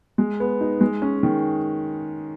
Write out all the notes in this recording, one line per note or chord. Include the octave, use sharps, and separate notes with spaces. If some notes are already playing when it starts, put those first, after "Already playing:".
G#3
B3
D#4
G#3
C#4
D#3